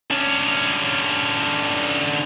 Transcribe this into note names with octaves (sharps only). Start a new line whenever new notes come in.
D3 C#4